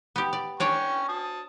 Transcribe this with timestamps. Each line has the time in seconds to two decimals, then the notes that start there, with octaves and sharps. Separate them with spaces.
0.16 B3 G4
0.33 D5
0.60 D4 C#5 D5 G5 G#5 C#6
1.08 A5 D#6